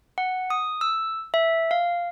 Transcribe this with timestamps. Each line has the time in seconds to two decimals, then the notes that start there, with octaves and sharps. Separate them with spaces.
0.18 F#5
0.50 D#6
0.81 E6
1.34 E5
1.71 F5